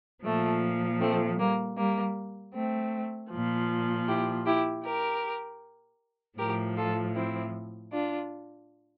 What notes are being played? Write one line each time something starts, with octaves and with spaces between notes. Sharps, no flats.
A#2 F3 A3
A3 C4
G3 A#3
G3 A#3
A3 C4
A#2 F3
E4 G4
E4 G4
G4 A#4
A2 F3 G4 A#4
F4 A4
C4 E4
D4 F4